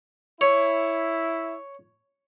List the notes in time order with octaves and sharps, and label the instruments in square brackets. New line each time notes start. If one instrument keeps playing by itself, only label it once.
[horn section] E4 [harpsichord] C#5